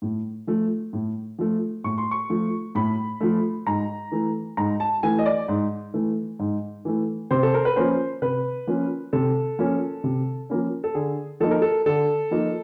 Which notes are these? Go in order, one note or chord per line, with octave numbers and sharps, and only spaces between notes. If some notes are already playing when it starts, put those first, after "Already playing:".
A2
F3 A3
A2
F3 A3
A2 C#6
C6
C#6
F3 A3
A2 B5
F3 A3
G#2 A#5
E3 A3
G#2 A#5
A5
E3 A3 G#5
D#5
D5
G#2
E3 A3
G#2
E3 A3
C3 C5
A4
A#4
B4
F3 A#3 C#4 C5
C3 B4
F3 A#3 C#4
C3 A4
F3 A#3 C#4
C3
F3 A#3 C#4
A4
D3 G#4
F3 A#3 D#4 A4
A#4
A4
D3 A4
F3 A#3 D#4